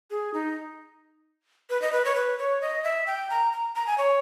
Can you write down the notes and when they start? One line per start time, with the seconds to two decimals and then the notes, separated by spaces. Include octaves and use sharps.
0.11 G#4
0.34 D#4
1.70 B4
1.82 D#5
1.93 B4
2.05 C#5
2.15 B4
2.38 C#5
2.62 D#5
2.84 E5
3.07 G5
3.30 A#5
3.53 A#5
3.76 A#5
3.87 G#5
3.98 C#5